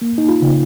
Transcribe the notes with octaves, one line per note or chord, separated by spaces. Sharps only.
A#3
D#4
F4
C#3